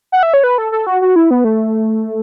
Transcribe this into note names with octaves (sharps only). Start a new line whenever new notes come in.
F#5
E5
C#5
B4
A4
A4
F#4
F#4
E4
B3
A3